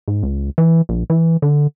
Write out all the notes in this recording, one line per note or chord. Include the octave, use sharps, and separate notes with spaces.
G#2
C#2
E3
A#1
E3
D3